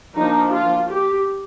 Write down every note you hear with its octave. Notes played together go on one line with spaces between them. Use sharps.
F3 A#3 D4 D#4
F4
G4